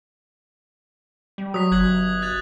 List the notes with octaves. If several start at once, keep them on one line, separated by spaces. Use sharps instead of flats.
G3
F#3 D#6 B6
G1 F#6 G#6 F#7
F#6 A6 F7